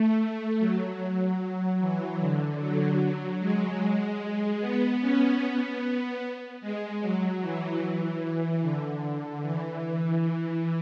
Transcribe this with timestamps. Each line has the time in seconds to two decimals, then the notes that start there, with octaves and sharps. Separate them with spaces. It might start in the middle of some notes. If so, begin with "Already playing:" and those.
Already playing: A3
0.59 F#3
1.80 E3
2.20 D3
2.59 F#3
3.40 G#3
3.80 G#3
4.61 B3
5.01 C#4
5.41 B3
5.81 B3
6.61 G#3
7.01 F#3
7.41 E3
8.62 D3
9.42 E3